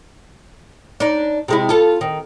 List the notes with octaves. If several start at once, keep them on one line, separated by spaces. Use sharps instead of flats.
D4 D#4
C3 G#3 E4
F4 A4
D#3